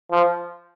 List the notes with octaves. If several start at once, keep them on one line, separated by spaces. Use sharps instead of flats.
F3